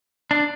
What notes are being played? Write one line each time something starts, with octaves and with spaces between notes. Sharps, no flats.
D4